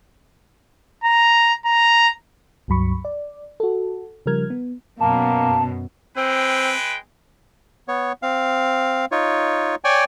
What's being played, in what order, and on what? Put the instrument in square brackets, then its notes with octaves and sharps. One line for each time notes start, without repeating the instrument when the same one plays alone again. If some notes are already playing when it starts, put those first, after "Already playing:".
[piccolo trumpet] A#5
A#5
[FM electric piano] C#2 G2 F#3 B5 C#6
D5
F#4 A4
C#3 F3 G3 A#4 F6 G#6
B3
[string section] F#2 B2 [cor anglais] A#3 [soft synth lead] A5
[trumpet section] G#3 B4 G5 [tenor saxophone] C4
[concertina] B3 C#5
C4 F5
D#4 F4 C#5
C#5 D5 G5 G#5